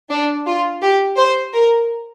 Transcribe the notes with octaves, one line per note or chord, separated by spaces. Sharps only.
D4
F4
G4
C5
A#4